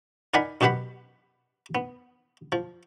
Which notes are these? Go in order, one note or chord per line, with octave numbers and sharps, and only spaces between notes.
D#4 A#4 D5 F#5 G#5 B5
F#2 B2 G4 B4 F#5 B5
B3
F3